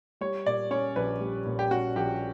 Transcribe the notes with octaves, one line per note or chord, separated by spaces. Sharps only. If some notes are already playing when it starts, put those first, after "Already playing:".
G3 C#5
A#2 D5
C#4 C#5
A#1 B4
G3
A#2
G4
C#4 F#4
A#1 G4